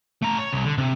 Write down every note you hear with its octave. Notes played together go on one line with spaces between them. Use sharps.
A3 A#5
C#5
C2
D3
C3